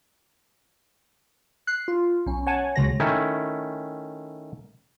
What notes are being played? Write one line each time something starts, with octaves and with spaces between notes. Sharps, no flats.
F#6 C7
F4
B1 C#4
C#5 F#5 G#5 A5
C#2 C#3 F#3 A#6
D#3 A3 C#4 E4